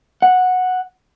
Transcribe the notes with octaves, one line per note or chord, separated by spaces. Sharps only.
F#5